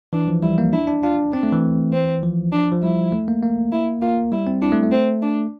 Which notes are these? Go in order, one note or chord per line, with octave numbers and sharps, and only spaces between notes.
E3 D4
F3
G3 E4
A#3
D4 E4
D4
D4 F4
C4 D4
A3
E3
C4
F3
D4
F3
G3 E4
A3
A#3
A#3
E4
A#3 F4
G3 E4
C4
D4 E4
A3
A3
C4
D4